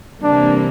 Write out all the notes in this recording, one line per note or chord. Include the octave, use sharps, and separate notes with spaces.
C3 E3 G3 A#3 D4